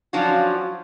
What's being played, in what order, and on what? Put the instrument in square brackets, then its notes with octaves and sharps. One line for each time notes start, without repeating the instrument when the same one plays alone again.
[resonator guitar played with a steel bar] F3 F#3 C#4 D4 F4 F#4